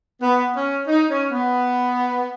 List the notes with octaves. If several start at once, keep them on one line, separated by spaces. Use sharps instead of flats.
B3
C#4
D#4
C#4
B3